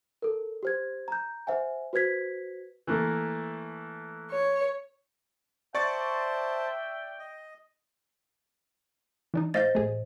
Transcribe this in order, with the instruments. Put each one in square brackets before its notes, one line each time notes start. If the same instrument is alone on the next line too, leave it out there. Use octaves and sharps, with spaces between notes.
[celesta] A4 A#4
G4 C5 G#6
A#5 G6
C5 E5 F#5 G#5
F#4 B4 C5 G#6 B6
[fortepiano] E3 A3 A#3
[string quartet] C#5
[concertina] C5 A5 [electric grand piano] D5 C#6 A6 [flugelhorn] E5 [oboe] G5
[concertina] D#5
[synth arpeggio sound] E3 D4 D#4
[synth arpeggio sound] A2 F5 G6 [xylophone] C5 D#5 A6
[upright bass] A1 [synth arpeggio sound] A3 G#4